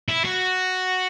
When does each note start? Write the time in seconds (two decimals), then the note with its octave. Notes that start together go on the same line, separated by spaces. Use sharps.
0.08 E4
0.25 F#4